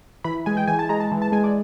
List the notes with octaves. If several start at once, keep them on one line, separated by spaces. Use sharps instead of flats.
E3 B5
G#3 G#5
G5
E3 G#5
A5
G#3 A#5
A5
E3
A5
G#3 G#5
D5